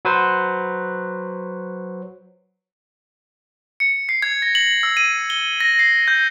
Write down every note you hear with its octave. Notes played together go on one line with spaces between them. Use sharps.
F#3 B4 C5
C#7
C7
G#6
A#6
F#7
E6
D#7
G7
A#6
C7
G6